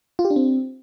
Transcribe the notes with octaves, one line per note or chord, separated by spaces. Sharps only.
F4
G4
D4
C4